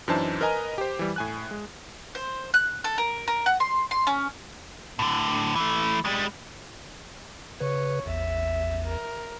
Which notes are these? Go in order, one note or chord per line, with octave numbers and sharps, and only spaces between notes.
F#2 E3 D4 D#4 C5 A5
A#4 B4 D#5 G#5 A#5
G4 C5
E3 G3
A2 G#5 F#6
G#3
C5
F#6
A4
A#4
A#4
F#5
C6
C6
C#4
A2 D3
E3 A3
G3 G#3
C#3 B4 C#5
A1 E2 E5
A#4